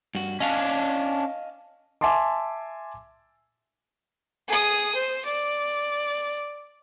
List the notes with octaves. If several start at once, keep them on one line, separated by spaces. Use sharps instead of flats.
G2 F#4
C#4 D4 D#5 F5
E5 G#5 A5 C6 D6
G#4 D#6
C5
D5